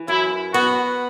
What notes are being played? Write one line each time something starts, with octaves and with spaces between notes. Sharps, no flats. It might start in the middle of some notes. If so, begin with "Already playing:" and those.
Already playing: E3
F#2 E4
B3 F#4